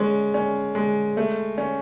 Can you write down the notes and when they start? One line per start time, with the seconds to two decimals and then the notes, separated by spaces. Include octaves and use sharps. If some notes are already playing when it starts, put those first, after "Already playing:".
Already playing: G#3 C#4
0.34 C#4
0.75 G#3
1.17 A3
1.58 C#4